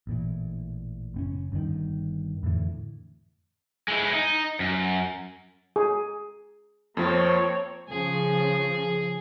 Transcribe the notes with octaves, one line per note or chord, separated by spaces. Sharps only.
A1 A#2 E3
F#1 C4 C#4
G1 G2 D3 D#3
F2 A2 D3 E3
G#3 E4
D#4
F#2
G#4
F2 F3 A#3 C4 C#5
C#3 F3 G#4